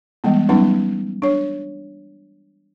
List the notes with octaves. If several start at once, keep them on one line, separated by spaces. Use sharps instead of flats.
E3 G3 G#3 B3
F#3 G3 B3 C#4 D#4 B4
D4 C#5